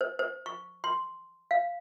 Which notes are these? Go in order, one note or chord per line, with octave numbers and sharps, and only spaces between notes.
C5
C5
C#6
C6
F5